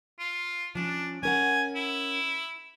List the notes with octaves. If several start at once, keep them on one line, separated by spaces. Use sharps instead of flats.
F4
F3 C#4 D4
C#4 A#4 F#5 G#5
E4